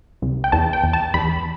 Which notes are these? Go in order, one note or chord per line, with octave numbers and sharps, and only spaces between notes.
C2
G5
E2 A5
G5
E2
A5
E2 B5